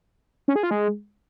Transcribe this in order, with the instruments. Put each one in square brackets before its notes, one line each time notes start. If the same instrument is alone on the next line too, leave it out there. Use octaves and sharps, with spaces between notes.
[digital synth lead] C#4
G#4
F4
G#3